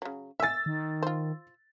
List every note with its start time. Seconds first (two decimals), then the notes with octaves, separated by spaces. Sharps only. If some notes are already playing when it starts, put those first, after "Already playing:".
0.02 C#3 F#3
0.40 E5 G#5 E6 A6
0.66 D#3
1.02 F4 C5